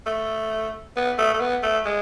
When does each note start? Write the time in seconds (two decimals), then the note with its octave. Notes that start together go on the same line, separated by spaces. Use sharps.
0.06 A3
0.96 B3
1.18 A3
1.33 A3
1.40 B3
1.63 A3
1.85 G#3